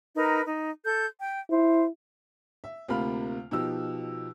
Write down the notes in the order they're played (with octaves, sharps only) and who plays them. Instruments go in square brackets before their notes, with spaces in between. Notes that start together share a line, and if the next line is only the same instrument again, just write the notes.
[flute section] D#4 A#4 B4
D#4
A4 G6
G5
[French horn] E4 [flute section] C5
[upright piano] E5
D2 C3 A#3 F4 B5 F6
B2 F3 D#4 G4 E6